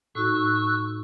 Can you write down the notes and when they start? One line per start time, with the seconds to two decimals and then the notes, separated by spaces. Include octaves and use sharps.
0.15 A2 D#4 F#4 C#6 E6 F#6